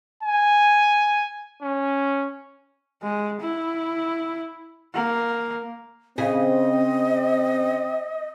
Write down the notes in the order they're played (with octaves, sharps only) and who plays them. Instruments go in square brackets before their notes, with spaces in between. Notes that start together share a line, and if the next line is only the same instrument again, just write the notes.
[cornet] G#5
C#4
[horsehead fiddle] G#3
E4
A#3
[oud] C#3 G#4 [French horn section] C4 [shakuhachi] D#5